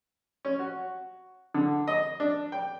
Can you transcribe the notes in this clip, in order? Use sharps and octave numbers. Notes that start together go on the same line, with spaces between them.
C#4
F#4
D3
D#5
D4
G5